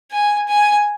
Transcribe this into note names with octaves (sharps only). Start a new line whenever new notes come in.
G#5
G#5